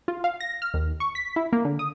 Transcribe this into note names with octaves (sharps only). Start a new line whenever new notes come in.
F4
F5
A#6
F6
D#2
C#6
B6
E4
A#3
D3
D#6